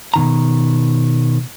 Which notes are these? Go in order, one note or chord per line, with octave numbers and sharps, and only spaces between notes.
B2 D#3 A#5